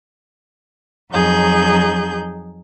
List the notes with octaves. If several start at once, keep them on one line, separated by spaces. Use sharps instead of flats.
F2 F#3 D#4 G#4 G6